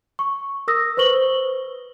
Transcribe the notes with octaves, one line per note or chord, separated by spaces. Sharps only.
C#6
A#4 D#6 E6 A#6
B4 C5 C#6 F#7 G7